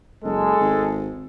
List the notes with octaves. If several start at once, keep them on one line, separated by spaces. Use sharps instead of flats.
F#1 G#3 A4
G#1